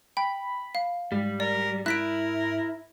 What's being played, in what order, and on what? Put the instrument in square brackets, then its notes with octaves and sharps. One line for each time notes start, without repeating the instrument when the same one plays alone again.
[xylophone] G5 [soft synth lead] B5
[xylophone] F5
[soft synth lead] G#2 [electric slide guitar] G3
[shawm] A#4 [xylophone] D5
[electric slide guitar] E4 [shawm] A#4 [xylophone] F#6 B6 D7